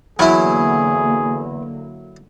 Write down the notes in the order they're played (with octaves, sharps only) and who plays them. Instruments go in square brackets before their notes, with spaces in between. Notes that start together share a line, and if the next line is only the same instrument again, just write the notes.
[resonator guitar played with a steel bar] E2 [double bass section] D3 A#3 [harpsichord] F#3 E4 [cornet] G#4